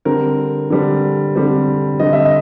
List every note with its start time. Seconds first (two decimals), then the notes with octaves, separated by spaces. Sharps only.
0.05 D3 G3 C4 A#4
0.70 D3 G3 C4
1.35 D3 G3 C4
1.99 D3 G3 C4 D#5
2.13 E5
2.25 D#5